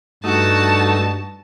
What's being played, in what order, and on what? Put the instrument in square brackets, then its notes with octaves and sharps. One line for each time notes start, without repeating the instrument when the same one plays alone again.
[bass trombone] G2 [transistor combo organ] A3 D#4 [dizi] F#4 [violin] A5